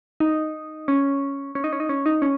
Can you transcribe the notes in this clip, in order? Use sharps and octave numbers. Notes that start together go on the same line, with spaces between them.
D#4
C#4
C#4
D#4
C#4
D#4
C#4
D#4
C#4